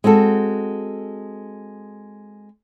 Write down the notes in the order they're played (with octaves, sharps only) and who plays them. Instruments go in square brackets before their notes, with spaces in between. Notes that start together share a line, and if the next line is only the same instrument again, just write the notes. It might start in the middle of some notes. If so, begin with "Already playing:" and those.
[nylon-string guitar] G#3 C4 F#4 A4